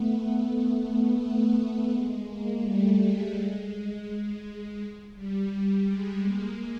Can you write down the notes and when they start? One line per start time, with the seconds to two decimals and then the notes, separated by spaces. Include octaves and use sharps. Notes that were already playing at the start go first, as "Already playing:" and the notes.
Already playing: A3 B3
1.19 A3 B3
1.55 A3 B3
1.91 G#3
2.26 G#3 A#3
2.63 G3 A3
2.98 G#3
4.07 G#3
5.15 G3
5.51 G3
5.87 G#3
6.23 G#3 A#3